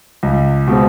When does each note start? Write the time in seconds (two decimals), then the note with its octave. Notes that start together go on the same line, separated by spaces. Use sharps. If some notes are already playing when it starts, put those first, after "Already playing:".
0.23 C#2
0.68 B2 G#3 C4